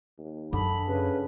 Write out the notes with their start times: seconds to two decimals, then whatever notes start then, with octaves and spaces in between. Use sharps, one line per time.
0.18 D#2
0.53 F#2 D3 G#4 B5
0.88 C#3 B4